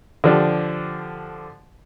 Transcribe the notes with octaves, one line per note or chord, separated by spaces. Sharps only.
D3 F3 D4 G4